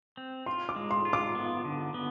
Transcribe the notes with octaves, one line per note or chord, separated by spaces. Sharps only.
C4
F4 C6
D6
G#3
C6
F4
D6
B3
D3
B3